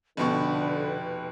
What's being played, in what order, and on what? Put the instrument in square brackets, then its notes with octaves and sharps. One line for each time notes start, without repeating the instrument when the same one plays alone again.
[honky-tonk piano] F1 B2 C#6 [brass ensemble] D3 [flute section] B4 G5